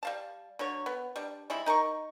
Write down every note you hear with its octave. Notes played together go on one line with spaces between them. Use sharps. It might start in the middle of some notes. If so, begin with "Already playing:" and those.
G3 F5 A5
D3 F#3 C#5
B3
G3 D4
G3 G#3 E4 B5
D#4 A#4 A5 C#6